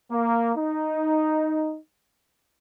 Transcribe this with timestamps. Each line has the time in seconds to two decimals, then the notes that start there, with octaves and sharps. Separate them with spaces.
0.11 A#3
0.56 D#4